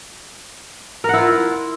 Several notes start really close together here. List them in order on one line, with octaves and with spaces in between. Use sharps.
A#4 F#5 E4 F4